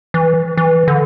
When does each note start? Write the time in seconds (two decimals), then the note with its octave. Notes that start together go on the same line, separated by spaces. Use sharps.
0.14 E3
0.57 E3
0.88 D3